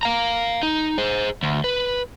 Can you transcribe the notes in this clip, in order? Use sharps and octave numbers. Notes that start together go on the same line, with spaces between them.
F5 A#5
D#4
G#4 C5
D2
B4